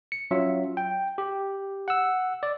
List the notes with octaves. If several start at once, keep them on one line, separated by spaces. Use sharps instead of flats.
C#7
F#3 C#4 F4 E5
G5
G4
F#5 E6
D5